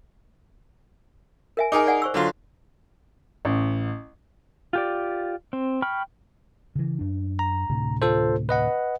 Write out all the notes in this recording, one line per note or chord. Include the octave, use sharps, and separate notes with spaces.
A#4 E5 G#5
D#4 G#4 A#4 G#5 D6
D5 F#5 G#5
C5 C#6 E6
D3 F#3 F4
A1
F4 G4 D5
C4
G5 B5 C#6 F6
C#3 E3
F#2 D4
A#5
D2 A2 C3
F4 A4 C5
B4 D#5 F#5